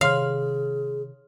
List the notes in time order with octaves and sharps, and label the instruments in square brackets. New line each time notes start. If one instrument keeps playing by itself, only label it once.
[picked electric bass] C3 D#3 [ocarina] G#4 [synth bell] C#5 C6 F6 [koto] F5